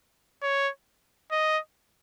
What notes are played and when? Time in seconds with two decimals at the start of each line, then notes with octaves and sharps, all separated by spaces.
0.43 C#5
1.32 D#5